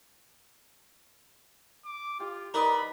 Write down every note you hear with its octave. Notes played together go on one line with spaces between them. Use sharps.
D6
F4 G4
D#4 A#4 B4 D5 D#5 B5